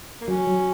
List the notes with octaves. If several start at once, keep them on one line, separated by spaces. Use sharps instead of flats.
A#3
F#3 C#4
F#3